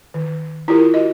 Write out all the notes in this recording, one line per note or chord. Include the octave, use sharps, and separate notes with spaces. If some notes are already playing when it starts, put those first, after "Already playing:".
D#3
E4 F4 G4 A#4
F#4 D#5